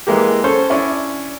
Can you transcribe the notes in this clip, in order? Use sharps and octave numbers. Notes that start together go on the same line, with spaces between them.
E3 G#3 A#3 G4
C#4 A4 C5
C#4 D4 E4